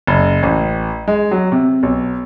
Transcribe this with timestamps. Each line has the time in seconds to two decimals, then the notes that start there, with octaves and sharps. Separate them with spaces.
0.07 F#1
0.43 A1
1.08 G#3
1.31 F#3
1.52 C3
1.83 B1